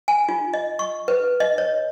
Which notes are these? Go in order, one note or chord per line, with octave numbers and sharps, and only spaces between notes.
G#5
F4
D#5
C#6
B4
D#5
C#5